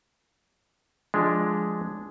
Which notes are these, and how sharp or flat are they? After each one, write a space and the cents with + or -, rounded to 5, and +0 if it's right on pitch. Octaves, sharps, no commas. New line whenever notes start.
F3 +0 G#3 +0 D4 +0